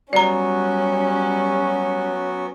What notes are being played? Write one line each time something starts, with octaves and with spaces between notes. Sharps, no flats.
F#3 G3 B3 C#4 F#4 D5 A#5